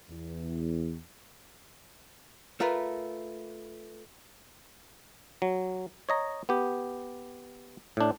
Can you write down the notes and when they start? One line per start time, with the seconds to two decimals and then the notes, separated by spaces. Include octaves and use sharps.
0.10 E2
2.60 A3 F4 A#4 B4
5.42 F#3
6.09 C#5 D#5 A#5
6.49 B3 G4
7.97 A2 D4